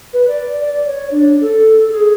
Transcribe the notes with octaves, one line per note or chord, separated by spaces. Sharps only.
B4
D5
D5
C#5
D4
A4
G#4